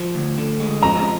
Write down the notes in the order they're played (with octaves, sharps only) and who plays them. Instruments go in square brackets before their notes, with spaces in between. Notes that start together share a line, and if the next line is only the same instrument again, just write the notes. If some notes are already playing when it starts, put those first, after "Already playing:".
Already playing: [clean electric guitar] F3
D2
D3
G#3
[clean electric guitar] F3 [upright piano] A#5